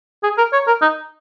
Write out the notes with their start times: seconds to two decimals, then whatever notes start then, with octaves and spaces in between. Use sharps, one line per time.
0.23 G#4
0.38 A#4
0.53 C#5
0.67 A#4
0.82 D#4